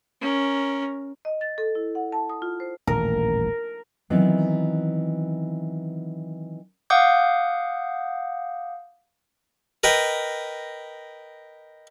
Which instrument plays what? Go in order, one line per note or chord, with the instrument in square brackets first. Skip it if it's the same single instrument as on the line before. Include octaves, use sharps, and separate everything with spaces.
[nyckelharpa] C#4 A#4
[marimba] D#5
A6
A4
E4
F#5
A5
D#6
F4
C5
[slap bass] D#1 A1 [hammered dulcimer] A#4
[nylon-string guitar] D#3 E3 F#3 B3 C4
[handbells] F5 F#5 D6 D#6 G6
[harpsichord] A#4 B4 D#5 G5